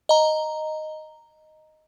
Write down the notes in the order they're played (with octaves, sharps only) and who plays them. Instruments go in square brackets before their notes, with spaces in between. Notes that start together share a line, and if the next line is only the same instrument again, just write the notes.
[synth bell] D#5 A#5